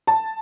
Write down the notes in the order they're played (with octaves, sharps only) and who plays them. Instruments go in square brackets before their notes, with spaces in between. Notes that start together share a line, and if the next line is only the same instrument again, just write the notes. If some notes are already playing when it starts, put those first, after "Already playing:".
[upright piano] A5